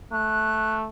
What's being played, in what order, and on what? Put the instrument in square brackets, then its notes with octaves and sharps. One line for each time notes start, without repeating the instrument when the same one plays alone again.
[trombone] A3 [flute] F#6